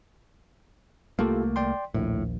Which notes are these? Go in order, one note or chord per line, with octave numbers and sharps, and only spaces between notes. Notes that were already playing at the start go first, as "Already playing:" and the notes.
C2 A3 A#3 F4 G4 A4
D5 G5 C6
A#1 D#2 A2